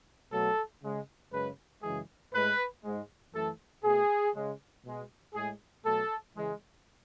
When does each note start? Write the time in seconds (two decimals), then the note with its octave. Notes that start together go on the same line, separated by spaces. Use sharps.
0.32 B2 F#3 A3 A4
0.83 C#3 G#3
1.32 F#2 C#3 G#3 B4
1.83 F#2 C#3 E3 G#3 G#4
2.34 A2 G#3 B4
2.84 G#2 G#3
3.34 F#2 E3 A3 A4
3.84 B2 A3 G#4
4.34 C#3 G#3
4.85 B2 G#3
5.34 A2 G#3 G#4
5.85 B2 F#3 A3 A4
6.35 C#3 E3 G#3